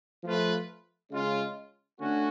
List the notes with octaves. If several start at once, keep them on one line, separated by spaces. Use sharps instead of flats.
F3 A3 F4 B4
C#3 G#3 C#4 F4
D3 A3 C#4 F#4